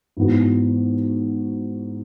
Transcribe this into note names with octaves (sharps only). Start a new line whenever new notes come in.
G#2 E3 B3 F#4